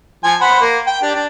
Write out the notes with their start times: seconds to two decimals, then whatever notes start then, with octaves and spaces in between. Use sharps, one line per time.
0.24 F3 G#5
0.41 C5 F#5 B5
0.61 A#3
0.87 G5
1.02 D4 G4
1.15 D4